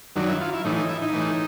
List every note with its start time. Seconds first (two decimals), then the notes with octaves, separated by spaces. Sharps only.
0.16 F#2 D#3 F#3 D4
0.28 E4
0.41 F4
0.53 E4
0.65 A2 E3 D#4
0.77 D#4
0.89 E4
1.02 D#4
1.13 A2 E3